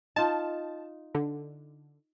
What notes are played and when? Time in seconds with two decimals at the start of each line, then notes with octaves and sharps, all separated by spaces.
0.16 D#4 F4 A5
1.15 D3